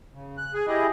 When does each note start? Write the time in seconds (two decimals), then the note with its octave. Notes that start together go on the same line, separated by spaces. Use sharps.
0.14 C#3
0.38 F#6
0.54 G#4 G#5
0.67 E4 G4 G#4 D#5